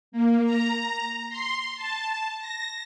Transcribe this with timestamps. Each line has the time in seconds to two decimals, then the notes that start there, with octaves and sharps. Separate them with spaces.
0.12 A#3
0.43 A#5
1.29 C6
1.76 A5
2.39 A#6